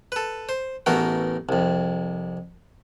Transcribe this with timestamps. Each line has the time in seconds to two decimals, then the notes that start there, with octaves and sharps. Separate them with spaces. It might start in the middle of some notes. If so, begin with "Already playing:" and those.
0.12 A4 B4
0.49 C5
0.86 A1 E3 A3 B3 F#4 A#4
1.49 C2 F2